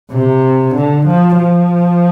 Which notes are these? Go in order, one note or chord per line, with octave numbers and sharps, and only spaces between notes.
C3
D3
F3
F3